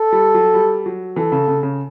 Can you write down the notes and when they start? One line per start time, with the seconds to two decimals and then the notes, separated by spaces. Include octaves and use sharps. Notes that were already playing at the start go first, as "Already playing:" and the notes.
Already playing: A4
0.12 G3
0.34 F#3
0.54 G3
0.86 F#3
1.16 E3 A4
1.32 C#3
1.48 C#3
1.63 C#3